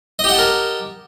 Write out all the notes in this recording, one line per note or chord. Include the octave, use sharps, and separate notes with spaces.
G4 A#4 D#5 F#5 A5